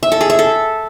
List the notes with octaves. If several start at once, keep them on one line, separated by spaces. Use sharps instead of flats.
E5
A4
G#4
E5
A4